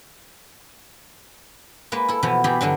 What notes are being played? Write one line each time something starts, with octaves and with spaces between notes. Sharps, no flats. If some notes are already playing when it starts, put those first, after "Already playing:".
G#3 A#3 B4
E4 A4
B2 E3 F3 B3
E3 G4 G#4 G5 A#5 B5
G2 D3 F#3 D4